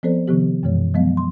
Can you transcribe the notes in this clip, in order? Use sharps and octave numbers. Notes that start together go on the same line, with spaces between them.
F3 B3 C4 A4 C5 D5
C3 D#3 F3 B3 G4
F#2 B2 E3 G#3 C#5
F3 F#3 G#3 B3 D#5 F5
C6